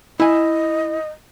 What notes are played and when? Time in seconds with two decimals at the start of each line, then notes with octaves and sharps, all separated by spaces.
0.20 E4 D#5 G#5